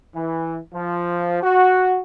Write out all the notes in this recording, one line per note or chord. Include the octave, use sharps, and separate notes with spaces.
E3
F3
F#4